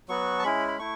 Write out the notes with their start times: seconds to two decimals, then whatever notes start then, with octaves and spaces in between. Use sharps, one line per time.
0.08 F#3 B3 F#4 C#6
0.39 A5
0.43 G#3 C#4 E4 B5
0.68 B5
0.78 A3 E4 C#6